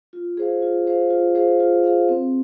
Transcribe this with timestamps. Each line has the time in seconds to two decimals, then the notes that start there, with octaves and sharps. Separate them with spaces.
0.13 F4
0.37 G#4 C5 F5
0.62 F4
0.87 G#4 C5 F5
1.11 F4
1.35 G#4 C5 F5
1.60 F4
1.84 G#4 C5 F5
2.09 C4